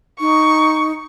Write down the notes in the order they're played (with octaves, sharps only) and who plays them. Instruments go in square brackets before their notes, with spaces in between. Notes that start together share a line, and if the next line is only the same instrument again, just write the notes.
[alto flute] D#4 [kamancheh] C#6